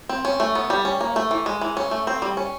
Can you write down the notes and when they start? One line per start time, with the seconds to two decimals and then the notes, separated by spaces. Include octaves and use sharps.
0.09 C4
0.25 C#4
0.40 A3
0.55 B3
0.70 G3
0.85 C#4
1.01 A#3
1.16 A3
1.31 E3
1.46 G#3
1.61 E3
1.77 C#4
1.91 A3
2.07 C4
2.22 G3
2.37 C#4